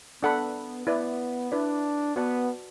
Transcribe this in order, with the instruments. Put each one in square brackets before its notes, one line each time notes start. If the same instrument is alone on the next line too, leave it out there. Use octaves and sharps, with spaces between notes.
[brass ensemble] B3 [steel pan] D4 A4 F#5 B5
[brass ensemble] B3 [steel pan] E4 B4 D5
[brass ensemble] D4 [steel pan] E4 B4 D5
[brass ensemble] B3 [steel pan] F#4 B4 D5 F#5 A5